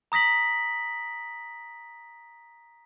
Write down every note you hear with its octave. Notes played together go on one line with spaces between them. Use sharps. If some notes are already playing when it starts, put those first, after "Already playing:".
A#5 D#6 A#6 B6 F#7